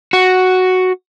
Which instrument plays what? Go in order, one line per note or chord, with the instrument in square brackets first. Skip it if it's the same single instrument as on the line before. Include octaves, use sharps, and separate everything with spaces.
[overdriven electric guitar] F#4